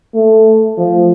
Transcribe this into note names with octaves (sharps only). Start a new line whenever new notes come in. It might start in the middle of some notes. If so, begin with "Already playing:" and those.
A3
F3